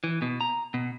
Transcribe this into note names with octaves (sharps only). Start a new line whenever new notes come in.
E3
B2
A#5
B2